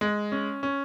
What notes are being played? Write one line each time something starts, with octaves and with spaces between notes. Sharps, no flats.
G#3
C#4
C#4